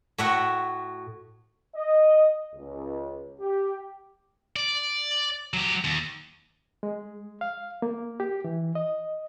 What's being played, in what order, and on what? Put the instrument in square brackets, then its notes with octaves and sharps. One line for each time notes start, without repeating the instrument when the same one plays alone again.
[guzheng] A2 F#4 E5 F#5
[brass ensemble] D#5
C#2
G4
[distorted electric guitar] D5
F#3 G4
D#2
[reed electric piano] G#3
F5
A#3
G4
E3
D#5